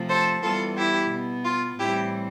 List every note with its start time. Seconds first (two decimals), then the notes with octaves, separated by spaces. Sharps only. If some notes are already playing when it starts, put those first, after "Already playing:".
Already playing: C3 F3 A3
0.09 A4 C5
0.43 E3 G3 B3 F4 A4
0.77 E4 G4
1.11 B2 B3
1.45 F4
1.79 A2 E3 G3 C4 E4 G4